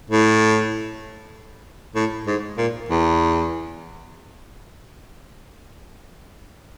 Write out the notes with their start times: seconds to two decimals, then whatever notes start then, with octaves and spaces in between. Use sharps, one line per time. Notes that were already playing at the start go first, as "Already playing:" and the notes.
0.10 A2
1.96 A2
2.27 G#2
2.57 A#2
2.89 E2